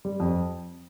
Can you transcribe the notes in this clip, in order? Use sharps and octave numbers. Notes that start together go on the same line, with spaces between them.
G3
F2